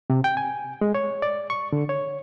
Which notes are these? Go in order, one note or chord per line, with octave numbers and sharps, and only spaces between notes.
C3
G5
G#5
G#3
C#5
D5
C#6
D3
C#5